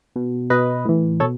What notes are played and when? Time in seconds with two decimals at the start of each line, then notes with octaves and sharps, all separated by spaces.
0.16 B2
0.50 B2 B4 D#5
0.85 A2 E3
1.20 B2 A4 C#5